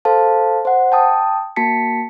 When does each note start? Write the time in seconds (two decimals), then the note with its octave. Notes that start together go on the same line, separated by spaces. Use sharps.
0.05 A4 C5 F5 A5
0.65 C5 F#5
0.92 G5 A5 D#6
1.56 A#3 F#4 A5 B6 C#7